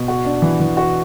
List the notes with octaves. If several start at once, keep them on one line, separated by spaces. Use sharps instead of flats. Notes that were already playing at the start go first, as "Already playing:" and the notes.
Already playing: B2
F#4
D4
E3
E3
F#4